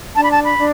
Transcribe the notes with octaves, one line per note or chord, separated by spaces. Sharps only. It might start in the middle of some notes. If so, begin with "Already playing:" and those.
D4 A5
B5
A5
B5
D4